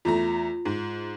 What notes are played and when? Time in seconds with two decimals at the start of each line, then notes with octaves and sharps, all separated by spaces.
0.05 E2 A3 F4 A#5
0.65 G#2